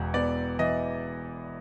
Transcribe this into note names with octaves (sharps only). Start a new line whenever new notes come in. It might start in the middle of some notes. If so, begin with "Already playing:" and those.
Already playing: E1 E2
B3 D5
E3 D#5